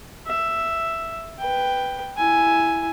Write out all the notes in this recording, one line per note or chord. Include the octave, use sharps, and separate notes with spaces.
E5
B4 G5
E4 G#5